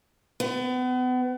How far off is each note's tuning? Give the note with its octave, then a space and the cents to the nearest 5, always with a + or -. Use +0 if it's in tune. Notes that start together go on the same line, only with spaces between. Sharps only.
B3 +35